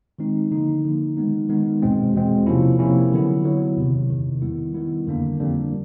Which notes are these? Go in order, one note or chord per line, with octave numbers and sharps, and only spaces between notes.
D#3 G#3 C4 D#4
D3 F3 A#3 D#4
D3 F3 A#3 D#4
D#3 G#3 B3 D#4
D#3 G#3 B3 D#4
E2 B2 G#3 C4
E2 B2 G#3 C4
C3 F3 A#3 C#4 E4
C3 F3 A#3 C#4 E4
D3 F#3 B3 E4
D3 F#3 B3 E4
E2 C3 D#3
E2 C3 D#3
D#3 G3 B3 E4
D#3 G3 B3 E4
F2 D3 G3 A#3 D4
F2 D3 G3 A#3 D4